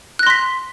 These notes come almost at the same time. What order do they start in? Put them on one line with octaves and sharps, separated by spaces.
F#6 A#6 C6 B6